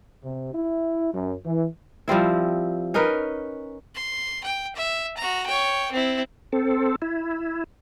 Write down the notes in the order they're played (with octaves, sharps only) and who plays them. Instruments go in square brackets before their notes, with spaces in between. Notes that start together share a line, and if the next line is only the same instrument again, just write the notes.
[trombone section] C3
E4
F#2
E3
[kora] F3 G3 C4 E4
C#4 D#4 A#4 B4
[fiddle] C6
G5
E5
F#4 A#5
C#5 G5
C4 E4
[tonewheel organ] C4 A4
E4